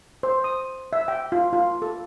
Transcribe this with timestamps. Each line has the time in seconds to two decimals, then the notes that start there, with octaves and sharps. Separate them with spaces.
0.23 C5
0.44 D#6
0.93 E5
1.08 G5
1.32 F4
1.53 F4
1.82 A4